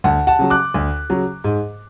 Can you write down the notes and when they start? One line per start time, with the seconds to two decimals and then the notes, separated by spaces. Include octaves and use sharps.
0.04 D2 F#5 A5
0.27 F#5 A5
0.39 C#3 F#3
0.50 D6 F#6
0.74 D2
1.09 C#3 F#3
1.44 G#2